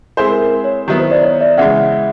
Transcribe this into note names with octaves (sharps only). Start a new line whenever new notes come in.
G#3 C4 E4 G#4 A4 C5
A#4
A#4
C#5
D#3 F#3 B3 E4 G4
C5
C5 D5
C#5 D#5
D5 E5
C#3 E3 G#3 E5 F#5